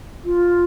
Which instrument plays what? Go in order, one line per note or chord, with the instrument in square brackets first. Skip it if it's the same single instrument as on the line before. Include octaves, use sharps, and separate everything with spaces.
[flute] F4